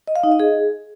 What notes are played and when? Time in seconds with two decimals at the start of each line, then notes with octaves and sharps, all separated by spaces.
0.08 D#5
0.16 F5
0.24 D#4
0.32 D#5
0.40 G#4